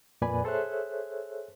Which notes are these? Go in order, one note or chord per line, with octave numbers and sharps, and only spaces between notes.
F2 A#2 B4 D5 G#5 B5
G#4 A4 C5 C#5 E5 F#6